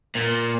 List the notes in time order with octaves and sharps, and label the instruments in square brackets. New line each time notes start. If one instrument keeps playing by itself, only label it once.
[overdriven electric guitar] A#2